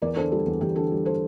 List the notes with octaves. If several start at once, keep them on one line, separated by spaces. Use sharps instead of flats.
E2 A#4 D5
D3 A4 C5
G3 A4
E2
E2 G4
D3 A4
G3
A4 C5